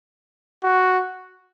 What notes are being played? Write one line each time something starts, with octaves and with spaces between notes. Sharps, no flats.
F#4